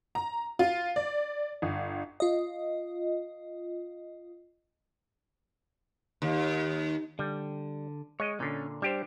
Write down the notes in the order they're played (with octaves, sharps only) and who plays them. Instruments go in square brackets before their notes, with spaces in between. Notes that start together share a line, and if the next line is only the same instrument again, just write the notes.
[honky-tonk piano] A#5
F4
D5
G1
[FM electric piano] F4 D#5
[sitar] D#2
[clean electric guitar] D3 [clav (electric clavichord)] G3
[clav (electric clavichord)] G#3 D#5 [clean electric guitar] C#5
[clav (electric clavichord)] A#2 D3 [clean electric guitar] C#4
[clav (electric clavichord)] G3 G4 C5 [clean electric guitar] D4